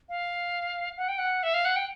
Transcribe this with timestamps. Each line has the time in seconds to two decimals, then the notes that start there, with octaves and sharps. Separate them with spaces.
0.09 F5
0.97 F#5
1.08 G5
1.18 F#5
1.43 E5
1.54 F5
1.65 F#5
1.76 G5